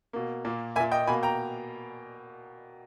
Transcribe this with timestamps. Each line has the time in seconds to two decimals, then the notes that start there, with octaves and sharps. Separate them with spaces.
0.13 B2 A#3
0.45 A#2 A#3
0.76 A#3 E5 G#5
0.80 A#2
0.92 D#5 G5
1.07 B2 A#3 G#5 B5
1.23 G5 A#5